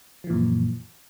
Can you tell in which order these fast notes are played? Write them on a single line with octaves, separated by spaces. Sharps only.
F3 E3 A#2 F#2